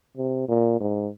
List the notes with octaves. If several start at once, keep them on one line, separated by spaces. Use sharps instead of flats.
C3
A#2
G#2